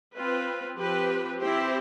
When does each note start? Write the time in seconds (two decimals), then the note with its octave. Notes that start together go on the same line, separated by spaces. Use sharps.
0.14 C4 F4 B4
0.77 F3 C4 G4 B4
1.40 C4 E4 G4 C5